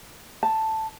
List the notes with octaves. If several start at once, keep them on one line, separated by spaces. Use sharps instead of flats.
A5